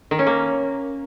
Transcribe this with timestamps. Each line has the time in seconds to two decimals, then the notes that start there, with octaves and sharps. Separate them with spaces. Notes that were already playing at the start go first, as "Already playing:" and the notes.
0.11 D#3
0.19 C#4
0.27 A#3